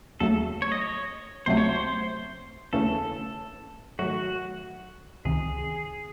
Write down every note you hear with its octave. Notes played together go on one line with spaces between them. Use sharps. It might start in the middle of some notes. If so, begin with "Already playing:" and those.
D#2 C#3 F#3 A3 A4
C#5
D#5
C#5
C#2 C3 F#3 A3 C5
C#5
C5
D#2 C#3 E3 A3 C#4 A4
G#2 D#3 F#3 A3 F#4
C#2 C3 D#3 G#4